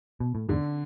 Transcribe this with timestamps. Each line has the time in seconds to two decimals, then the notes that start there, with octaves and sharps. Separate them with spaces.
0.20 B2
0.35 A2
0.49 E2 G#2 D3